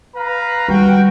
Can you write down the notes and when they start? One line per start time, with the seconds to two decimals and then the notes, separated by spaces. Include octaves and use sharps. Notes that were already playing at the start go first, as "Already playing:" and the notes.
0.15 B4 F5 A#5
0.68 G3 F#4 G5